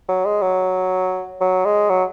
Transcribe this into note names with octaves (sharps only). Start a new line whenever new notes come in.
F#3
G#3
F#3
F#3
G#3
F#3